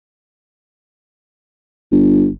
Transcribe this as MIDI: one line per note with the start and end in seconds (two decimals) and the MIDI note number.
1.92 2.28 31